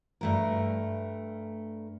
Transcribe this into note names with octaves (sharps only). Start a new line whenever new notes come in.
G2 A3 A#4